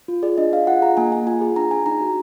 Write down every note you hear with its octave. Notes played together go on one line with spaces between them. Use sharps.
F4
G#4 D5
D4 D#5
D4 F5
F4 F#5
G#4 A#5
A#3 G#5
A#3 G#5
F4 G#5
G#4
D4 A#5
D4 G#5
D#4 A#5
F#4